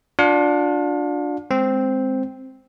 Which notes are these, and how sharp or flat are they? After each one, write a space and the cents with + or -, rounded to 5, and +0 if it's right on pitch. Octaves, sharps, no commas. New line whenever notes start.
D4 +0 F4 +40 F5 +40
G#3 +0 C4 +0